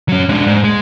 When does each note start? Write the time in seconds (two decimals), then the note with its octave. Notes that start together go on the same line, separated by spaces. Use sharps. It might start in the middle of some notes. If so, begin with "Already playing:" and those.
0.09 F#3 C#4
0.29 G#3 D4
0.47 G#2
0.64 G#3